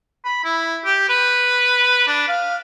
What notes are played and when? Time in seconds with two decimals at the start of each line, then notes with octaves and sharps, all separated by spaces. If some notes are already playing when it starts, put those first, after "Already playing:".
0.25 B5
0.45 E4
0.85 G4
1.09 B4
2.07 D4
2.28 F5